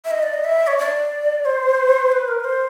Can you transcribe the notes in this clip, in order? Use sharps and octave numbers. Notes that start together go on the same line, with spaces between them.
E5
D#5
D5
D#5
E5
C#5
D5
C5
B4
A#4
B4
C5